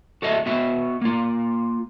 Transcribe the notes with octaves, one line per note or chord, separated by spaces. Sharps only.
F#4 A4 D#5 E5
B3 F#4 E5
A#3 F4